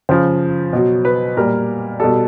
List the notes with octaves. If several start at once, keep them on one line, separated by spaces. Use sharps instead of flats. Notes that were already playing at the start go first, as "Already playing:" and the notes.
C#3 F3 C5
B2 F#3
B4
A#2 G3 A#4
B2 G3 A4